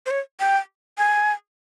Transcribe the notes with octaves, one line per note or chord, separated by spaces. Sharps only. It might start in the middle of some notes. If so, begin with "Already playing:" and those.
C5
C#5
G5
G#5